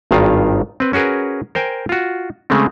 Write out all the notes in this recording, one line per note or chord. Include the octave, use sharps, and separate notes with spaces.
G#1 G2 D#3 F4 F5 A#5
C4 B4
C#4 F#4 G#4 A#4 B4
A#4 C5 G5 G#5
F4 F#4
C#3 G#3 A3 C4